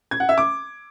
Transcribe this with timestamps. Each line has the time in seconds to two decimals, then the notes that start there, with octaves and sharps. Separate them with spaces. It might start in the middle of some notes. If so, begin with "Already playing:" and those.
0.11 G#6
0.20 F#5
0.29 E5
0.38 D6